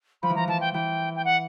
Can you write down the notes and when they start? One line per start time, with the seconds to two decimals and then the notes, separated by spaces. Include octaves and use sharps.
0.22 F3 B5
0.30 E3
0.35 F3 A#5
0.48 E3 A5
0.61 G5
0.73 E3 G5
1.16 G5
1.25 F#5